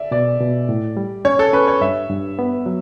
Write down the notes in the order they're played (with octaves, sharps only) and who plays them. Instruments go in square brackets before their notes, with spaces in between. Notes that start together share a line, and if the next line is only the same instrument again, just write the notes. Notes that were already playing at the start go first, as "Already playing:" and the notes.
Already playing: [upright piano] D5 E5
[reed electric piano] B2 [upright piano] D5
[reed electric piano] B2
A2
G3
[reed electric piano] C#4 [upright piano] C#5
[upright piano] A4
[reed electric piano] C#4 [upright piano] B4
[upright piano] C#5
[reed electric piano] G2 [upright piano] E5
[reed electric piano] G2
B3
F#3